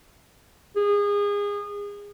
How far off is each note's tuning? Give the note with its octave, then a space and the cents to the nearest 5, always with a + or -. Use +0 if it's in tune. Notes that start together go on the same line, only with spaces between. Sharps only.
G#4 -25